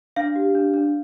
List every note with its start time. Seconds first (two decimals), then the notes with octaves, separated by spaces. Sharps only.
0.16 D4 F5
0.36 G4
0.55 D4
0.74 D4